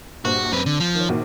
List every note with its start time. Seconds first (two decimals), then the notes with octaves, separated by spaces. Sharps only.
0.25 A#1 G2 F#4 C5
0.52 F#2 C4 B4 D#7
0.66 D3
0.80 F3
0.95 D#3 C#5
1.09 A#1 D#3 F#4